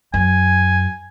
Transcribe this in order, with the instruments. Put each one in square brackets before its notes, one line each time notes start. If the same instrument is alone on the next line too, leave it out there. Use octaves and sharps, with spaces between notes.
[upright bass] F#2 [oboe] G#5